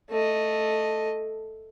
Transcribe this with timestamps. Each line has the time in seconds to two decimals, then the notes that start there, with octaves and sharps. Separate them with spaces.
0.10 A3 D#5